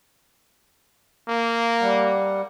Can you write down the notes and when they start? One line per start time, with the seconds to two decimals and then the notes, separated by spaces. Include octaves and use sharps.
1.28 A#3
1.81 G3 F#5